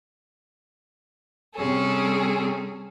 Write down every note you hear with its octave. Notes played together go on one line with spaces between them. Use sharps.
C3 G3 C#4 G#4 A4